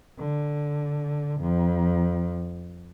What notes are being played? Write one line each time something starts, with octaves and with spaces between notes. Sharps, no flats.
D3
F2